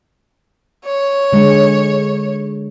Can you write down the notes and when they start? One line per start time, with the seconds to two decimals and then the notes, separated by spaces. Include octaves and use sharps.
0.85 C#5
1.33 D3 G#3